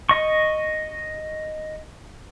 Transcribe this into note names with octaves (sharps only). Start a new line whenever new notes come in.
D#5 C#6